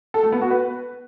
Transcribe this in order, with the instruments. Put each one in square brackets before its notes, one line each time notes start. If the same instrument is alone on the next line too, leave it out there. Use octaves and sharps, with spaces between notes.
[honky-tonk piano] A4
A3
B3
F#4
B4